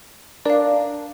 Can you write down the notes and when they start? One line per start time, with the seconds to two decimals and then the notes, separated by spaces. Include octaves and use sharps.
0.45 D4 A#4 D5 F5